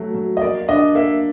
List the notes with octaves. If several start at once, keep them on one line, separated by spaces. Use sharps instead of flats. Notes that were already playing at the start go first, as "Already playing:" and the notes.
Already playing: F#3 A3
F#3
D#5
A#3 D5
D4 D#5
A#3 E5